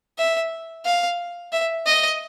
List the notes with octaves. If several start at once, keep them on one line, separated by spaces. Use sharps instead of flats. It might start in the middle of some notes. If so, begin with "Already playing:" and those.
E5
F5
E5
D#5